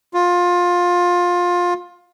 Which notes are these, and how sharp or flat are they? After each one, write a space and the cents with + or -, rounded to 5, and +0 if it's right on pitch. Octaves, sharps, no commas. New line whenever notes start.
F4 +20